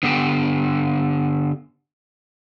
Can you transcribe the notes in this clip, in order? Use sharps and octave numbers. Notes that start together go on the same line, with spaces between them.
D3 B3 G4 G5